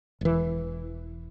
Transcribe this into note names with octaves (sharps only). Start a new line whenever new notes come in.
E1 E3